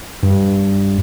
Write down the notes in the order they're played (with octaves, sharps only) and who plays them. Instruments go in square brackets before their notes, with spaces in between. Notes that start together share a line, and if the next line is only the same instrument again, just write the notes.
[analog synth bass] G2